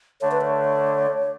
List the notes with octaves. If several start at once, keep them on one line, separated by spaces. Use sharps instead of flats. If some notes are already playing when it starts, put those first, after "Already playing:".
D3 A3 D4 C#5
B4
C#5